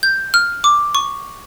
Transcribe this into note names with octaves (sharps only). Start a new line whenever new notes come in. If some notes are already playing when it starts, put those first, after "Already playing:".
G6
F6
D6
C#6